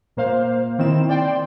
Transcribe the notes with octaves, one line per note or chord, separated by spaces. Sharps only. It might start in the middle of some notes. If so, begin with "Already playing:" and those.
A#2 A#3 C5 F5
D#3 C4 E4 E7
D5 G5 C6